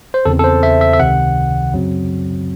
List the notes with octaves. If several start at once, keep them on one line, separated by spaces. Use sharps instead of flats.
C5
E2 C#3 E3 C4 A4
A4
C5
E5
E5
E5
C#2 C3 D#3 F#5
F#2 C#3 F#3 C4